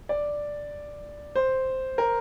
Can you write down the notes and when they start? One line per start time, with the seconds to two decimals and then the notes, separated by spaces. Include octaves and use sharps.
0.09 D5
1.35 C5
1.98 A#4